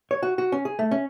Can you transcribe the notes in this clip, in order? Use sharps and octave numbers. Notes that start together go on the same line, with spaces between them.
C#5
F#4
F#4
C#4
G#4
A3
C#4